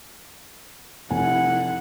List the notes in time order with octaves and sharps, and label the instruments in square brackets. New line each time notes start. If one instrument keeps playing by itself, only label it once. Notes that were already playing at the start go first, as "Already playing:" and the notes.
[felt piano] F1 G#5 [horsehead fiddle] E4 F#5